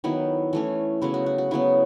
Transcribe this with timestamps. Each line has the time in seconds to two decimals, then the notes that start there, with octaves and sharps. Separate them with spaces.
0.04 D#3 F#3 B3 E4
0.53 E3 A3 C#4
1.02 C#3 F#3 B3 E4
1.14 F#4
1.26 F#4
1.38 F#4
1.51 C#3 F#3 B3 E4